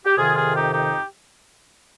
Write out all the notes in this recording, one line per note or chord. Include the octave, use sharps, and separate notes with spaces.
G4
F2 C3 D#3 F4 G#4
F4 G#4
D#4 G4
D#4 G4